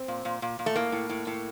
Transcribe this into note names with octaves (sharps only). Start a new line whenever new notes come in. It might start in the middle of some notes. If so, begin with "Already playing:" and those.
Already playing: C4
A#2
A#2
A#2
A#2
A3
A2 A#3
A2
A2
A2